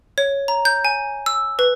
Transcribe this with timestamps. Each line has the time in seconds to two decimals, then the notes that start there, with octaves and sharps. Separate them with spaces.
0.18 C#5
0.48 A#5
0.65 G6
0.85 G#5
1.26 E6
1.59 B4